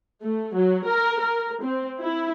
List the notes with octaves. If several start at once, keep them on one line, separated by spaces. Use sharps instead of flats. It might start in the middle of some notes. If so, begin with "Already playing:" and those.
A3
F#3
A#4
A#4
C4
E4